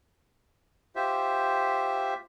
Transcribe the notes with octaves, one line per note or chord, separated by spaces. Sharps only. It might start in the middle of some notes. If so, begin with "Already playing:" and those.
F4 G4 C5 E5